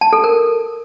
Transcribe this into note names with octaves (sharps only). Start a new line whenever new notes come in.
A5
A4
A#4